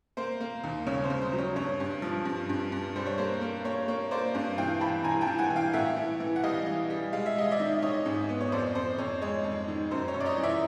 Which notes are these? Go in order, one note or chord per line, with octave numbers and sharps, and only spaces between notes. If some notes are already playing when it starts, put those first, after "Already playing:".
A#3 C5
A#3
D#2
C#3 C#5
C5
C#3
C5
F#3
C#5
G2 C#5
G2
F3
G2
G2
G2
G3 C5
C#5
A#3 C5
A#3
A#3 C#5
A#3 C#5
A#3 C5 D5
G2
E3 F5 G5
E3 A5 B5
E3 G#5 A#5
G5 A5
E3
F#5 G#5
E3
F5 G5
A2 E5 F#5
E3
E3
F#5
G3 D#5 F5
E3
G3
G#3 F5
E5
G#3 D#5
D5 E5
D#3
D#3 C#5 D#5
G#2
B3
C#5
F2 C5 D5
F2 C5
F2 C#5
G#3 C#5
F2
D#3
F#2 C5
C#5
F#2
D5
C#5 D#5
E3
D5 E5